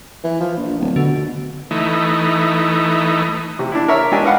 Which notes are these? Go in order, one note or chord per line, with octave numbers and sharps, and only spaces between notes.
E3
F3
A#1
D1
B2 D3
E3 A3 D#4
C3
D4 E4
A#4 C#5 E5
G#3 D4 G4 D#5 G#5
B4 D#5 F5 F#5 B5